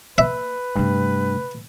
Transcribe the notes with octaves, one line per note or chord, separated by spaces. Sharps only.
A#3 B4 E5
G2 C3 A3